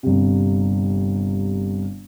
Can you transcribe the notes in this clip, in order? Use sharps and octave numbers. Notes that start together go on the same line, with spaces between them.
G1 C3